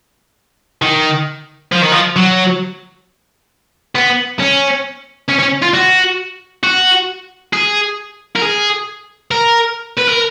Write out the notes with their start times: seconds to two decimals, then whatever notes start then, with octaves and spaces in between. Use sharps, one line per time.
0.82 D#3
1.72 F3
1.81 D#3
1.92 F3
2.16 F#3
3.95 B3
4.40 C#4
5.29 C#4
5.40 C#4
5.63 F4
5.74 F#4
6.63 F#4
7.53 G#4
8.36 A#4
8.42 G#4
9.31 A#4
9.98 B4
10.09 A#4